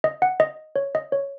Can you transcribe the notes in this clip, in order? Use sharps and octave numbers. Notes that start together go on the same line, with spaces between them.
D#5
F#5
D#5
C#5
D#5
C#5